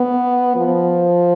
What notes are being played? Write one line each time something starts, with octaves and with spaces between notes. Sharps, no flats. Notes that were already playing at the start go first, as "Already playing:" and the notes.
Already playing: B3
F3